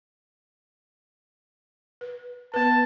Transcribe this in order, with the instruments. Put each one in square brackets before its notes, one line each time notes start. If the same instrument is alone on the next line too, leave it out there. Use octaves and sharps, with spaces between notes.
[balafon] B4
[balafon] B3 B4 [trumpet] A5